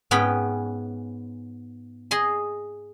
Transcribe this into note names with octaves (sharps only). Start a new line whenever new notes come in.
G#2 B3 C#4 G5 B5
G#4 D#5 C6